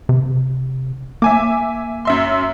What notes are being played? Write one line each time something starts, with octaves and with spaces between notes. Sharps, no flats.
C3
A#3 E5 G#5 D6
F#2 E5 C6